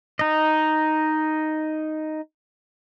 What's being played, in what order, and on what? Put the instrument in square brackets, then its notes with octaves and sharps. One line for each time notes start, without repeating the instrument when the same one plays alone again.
[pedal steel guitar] D#4 D#5